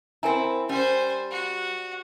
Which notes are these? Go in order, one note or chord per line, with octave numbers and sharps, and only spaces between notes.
C4 E4 A#4 G#5 A#5
G3 C#4 C5 G#5
F#4